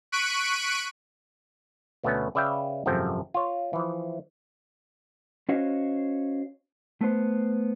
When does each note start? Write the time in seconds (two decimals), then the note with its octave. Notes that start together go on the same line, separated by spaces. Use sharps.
0.12 C#6 F#6 B6 D7 D#7
2.03 D2 B2 A3 B3 C#4
2.35 C#3 B4 D5 E5 F5 G5
2.86 G#1 F#2 C3 F3 A4 G5
3.34 F4 C#5
3.73 E3 F3
5.49 C#4 F#4 C5 C#5 D#5 F5
7.01 A3 B3 C5